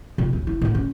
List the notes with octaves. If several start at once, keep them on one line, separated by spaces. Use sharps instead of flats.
A#2
D#1
E4
A2 D3
C#4